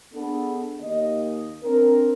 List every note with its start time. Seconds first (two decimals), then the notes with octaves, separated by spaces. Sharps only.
0.14 B3 D4 G#4 A4
0.81 D#2 D#5
1.63 C4 D4 A#4